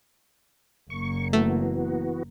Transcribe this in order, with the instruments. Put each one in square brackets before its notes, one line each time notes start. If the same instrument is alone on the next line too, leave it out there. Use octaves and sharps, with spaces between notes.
[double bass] F#1 A#3 [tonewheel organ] C#6
[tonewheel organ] E3 B3 F#4 [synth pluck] A3